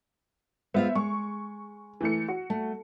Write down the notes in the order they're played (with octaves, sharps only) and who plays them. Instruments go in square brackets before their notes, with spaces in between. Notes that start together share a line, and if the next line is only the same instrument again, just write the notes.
[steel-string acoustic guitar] G#3 F4 F5 [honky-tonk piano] B3 C5 E5
[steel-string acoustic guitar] G#3 [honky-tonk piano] C#6
[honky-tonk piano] E3 A3 C#7
F#4
[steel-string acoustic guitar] A3